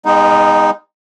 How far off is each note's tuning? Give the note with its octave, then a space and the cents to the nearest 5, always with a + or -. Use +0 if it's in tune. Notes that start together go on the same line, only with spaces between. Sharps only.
G#3 -40 B3 +0 D#4 +0